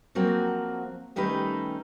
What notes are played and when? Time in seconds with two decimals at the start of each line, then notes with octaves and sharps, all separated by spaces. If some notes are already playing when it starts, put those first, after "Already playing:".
0.15 F3 F#3 A#3 C4 F#4
1.16 D#3 G3 A3 C#4 D#4 B4